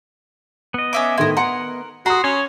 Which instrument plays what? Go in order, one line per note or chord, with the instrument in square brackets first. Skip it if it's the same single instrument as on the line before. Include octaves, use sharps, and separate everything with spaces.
[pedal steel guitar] B3 D#5
[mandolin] C#4 E5 D6
[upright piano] A2 D#3 C6 [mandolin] E4 A#4
[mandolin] A#4 [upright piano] F#5 C6 C#7
[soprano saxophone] F#4 [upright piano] A#5 D#6 [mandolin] C6
[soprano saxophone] C#4 [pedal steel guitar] C#5